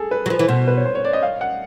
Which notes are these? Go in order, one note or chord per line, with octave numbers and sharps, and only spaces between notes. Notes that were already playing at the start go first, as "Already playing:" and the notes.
Already playing: G#4 A4
B4
F#3
F3 B4
E3
B2 C5
B4
C#5
C5
C#5
D5
D#5
F5
F#5